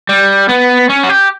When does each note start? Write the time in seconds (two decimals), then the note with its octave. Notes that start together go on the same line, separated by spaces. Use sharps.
0.09 G3
0.49 B3
0.89 C#4
1.03 F#4
1.09 G4